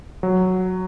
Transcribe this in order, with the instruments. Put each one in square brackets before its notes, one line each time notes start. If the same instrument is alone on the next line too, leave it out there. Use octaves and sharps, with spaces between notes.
[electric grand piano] F#3